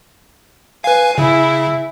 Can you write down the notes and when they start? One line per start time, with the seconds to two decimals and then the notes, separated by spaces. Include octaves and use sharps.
0.84 B4 F5 G#5
1.18 C#3 E4